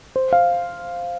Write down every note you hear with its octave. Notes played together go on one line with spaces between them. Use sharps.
C5
F5